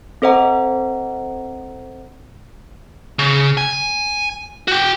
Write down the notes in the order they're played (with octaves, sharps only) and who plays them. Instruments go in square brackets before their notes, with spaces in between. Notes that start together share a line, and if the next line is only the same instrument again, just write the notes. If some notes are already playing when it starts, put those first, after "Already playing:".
[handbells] C4 A4 C5 D#5 F#5 A#5
[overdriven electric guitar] C#3
G#5
F#4 G5